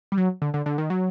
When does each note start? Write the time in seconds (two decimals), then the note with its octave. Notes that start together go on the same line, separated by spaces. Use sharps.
0.12 G3
0.18 F#3
0.42 D3
0.54 D3
0.66 D3
0.78 D#3
0.90 F#3